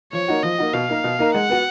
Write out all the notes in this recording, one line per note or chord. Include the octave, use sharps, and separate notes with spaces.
F3 C#5
A#3 D#4 F#4
F3 D#5
A#3 D#4 F#4
B2 F5
A#3 D#4 A#4
B2
A#3 D#4 A#4
G#3 F#5
B3 F#4